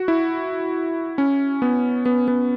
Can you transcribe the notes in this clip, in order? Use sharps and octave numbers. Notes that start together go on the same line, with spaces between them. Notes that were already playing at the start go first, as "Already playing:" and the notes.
Already playing: F#4
E4
C#4
B3
B3
B3